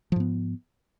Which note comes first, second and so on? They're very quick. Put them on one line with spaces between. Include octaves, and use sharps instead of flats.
F3 G#2 B3